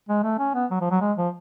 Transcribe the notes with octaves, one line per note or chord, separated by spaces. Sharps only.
G#3
A3
C#4
B3
F#3
F3
F#3
G#3
F3